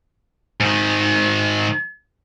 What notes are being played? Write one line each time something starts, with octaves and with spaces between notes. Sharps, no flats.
G#2 D#3